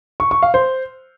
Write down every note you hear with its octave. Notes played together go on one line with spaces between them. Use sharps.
C#6
C#6
F5
C5